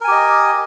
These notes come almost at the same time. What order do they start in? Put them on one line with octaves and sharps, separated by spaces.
A#4 G#5 G4 D#5